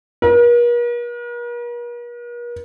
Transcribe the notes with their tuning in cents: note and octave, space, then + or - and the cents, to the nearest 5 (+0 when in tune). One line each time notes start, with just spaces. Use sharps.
A#4 +45